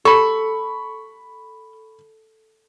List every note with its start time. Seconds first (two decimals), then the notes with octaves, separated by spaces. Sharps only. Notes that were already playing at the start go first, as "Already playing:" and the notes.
0.05 A4 B5 C#6